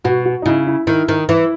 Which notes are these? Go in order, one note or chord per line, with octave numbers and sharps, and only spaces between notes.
B2 F#4
F#4
D#4
C#3 E4
E4
D#3 E4
D#3
E3 E4